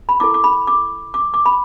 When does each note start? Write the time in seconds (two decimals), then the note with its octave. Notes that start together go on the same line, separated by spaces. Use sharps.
0.09 B5
0.20 E4 A4 D6
0.34 D6
0.44 B5
0.67 D6
1.14 D6
1.34 D6
1.46 B5